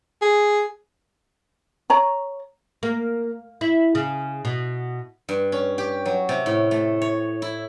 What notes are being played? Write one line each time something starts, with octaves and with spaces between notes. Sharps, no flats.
G#4
C#5 A#5
A#3
E4
C#3
B2
G2
C#4
G4
F#3
C3
A2
A3
C#5
E4